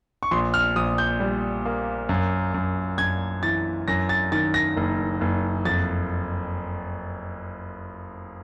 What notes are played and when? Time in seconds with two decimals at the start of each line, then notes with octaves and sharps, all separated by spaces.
0.23 C#6
0.31 A#1 C6
0.54 F6
0.76 A#1 D#6
0.98 G6
1.20 G3
1.65 A#3
2.09 F#2
2.54 F#2
2.98 F#2 G#6
3.43 E3 A6
3.88 F#2 A#6
4.09 A6
4.32 D#3 A6
4.54 A#6
4.77 F#1
5.21 F#1
5.65 F2 A6